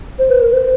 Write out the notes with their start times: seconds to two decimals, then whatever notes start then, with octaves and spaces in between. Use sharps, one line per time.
0.19 C5
0.30 B4
0.41 A#4
0.53 C5